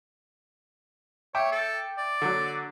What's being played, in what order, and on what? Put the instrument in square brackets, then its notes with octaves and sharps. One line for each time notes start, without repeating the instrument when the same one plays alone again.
[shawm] C#5 [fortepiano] E5 G5 D6
[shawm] A4
D5
[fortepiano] D3 F#3